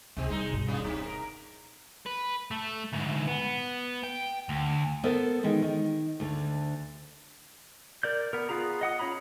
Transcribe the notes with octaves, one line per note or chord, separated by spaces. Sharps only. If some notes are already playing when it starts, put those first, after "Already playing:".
C#2 C3 G#3 C4 G#4
D#3 G3 G#3 D#4
G2 B2
D#2 C3 G#3
B2 D#4 E4
A#4
B4
A3
D2 G#2
B3
G5
D2
B3 A4 A#4 C5
D#3 E3 G#3 B3
D#3
D2 D3
A#4 D5 G6
B3 A#4
B3 F4 G#4 A#5
D#5 F#5 D#6
C#4 F4 C#5 A#5 B5